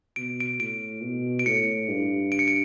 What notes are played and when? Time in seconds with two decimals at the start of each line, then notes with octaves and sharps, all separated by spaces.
0.16 B2 D7
0.40 D7
0.60 A2 D7
1.03 B2
1.39 D7
1.46 A2 C#7
1.89 G2
2.32 D7
2.39 C#7
2.48 D7